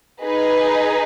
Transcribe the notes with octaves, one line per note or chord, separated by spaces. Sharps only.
D#4 G#4 B4